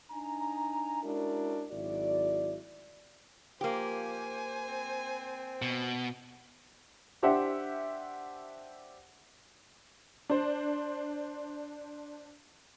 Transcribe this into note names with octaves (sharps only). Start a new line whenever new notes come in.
D4 D#4 G#5 A#5
G#3 C#4 D4 E4 F#4 A#4
G#1 F#3 E4 F#4 D5
F3 A#3 G4 C5 G#5
C4
B2
D4 G4 C5 E5 F#5
D4 C5